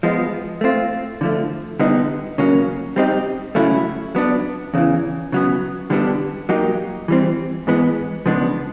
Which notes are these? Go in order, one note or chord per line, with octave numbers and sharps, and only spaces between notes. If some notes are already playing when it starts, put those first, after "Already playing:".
F3 G#3 B3
A3 C4 F4
D3 F3 A3
D3 G3 B3 D#4
C#3 F#3 A#3 C#4
G3 C4 D#4 G4 A#4
C#3 F#3 A3 C#4 E4
F#3 B3 D4
E2 C#3 E3
C#3 F#3 B3
D3 G3 B3 D4 G4
F#3 A#3 D#4 G4
E3 G3 C4
G#2 E3 G#3 B3
C#3 F3 G#3 B3 D4